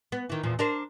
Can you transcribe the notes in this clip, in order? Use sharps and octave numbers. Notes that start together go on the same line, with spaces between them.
B3
D#3 E3
E2 A#2 F3
D4 A#4 C5